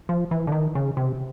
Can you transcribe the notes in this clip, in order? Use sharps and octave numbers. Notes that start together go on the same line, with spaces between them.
F3
E3
D3
D#3
C#3
C3